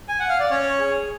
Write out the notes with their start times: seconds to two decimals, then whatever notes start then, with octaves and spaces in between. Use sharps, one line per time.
0.09 G#5
0.19 F#5
0.29 F5
0.40 D5
0.50 C#4 C#5
0.79 G#4